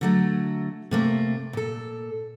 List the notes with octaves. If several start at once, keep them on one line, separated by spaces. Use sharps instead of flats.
D3 F#3 A3
C3 A3 A#3
A#2 A4